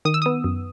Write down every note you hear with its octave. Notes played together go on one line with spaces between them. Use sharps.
D#3 D#6
E6
B3 D#6
F#2